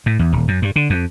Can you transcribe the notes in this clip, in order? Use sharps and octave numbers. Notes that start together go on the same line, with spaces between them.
A2
E2
D#1
F#2
G2
D3
F2